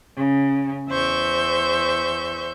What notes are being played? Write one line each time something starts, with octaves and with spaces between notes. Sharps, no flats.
C#3
E2 C5 E5 C#6 G6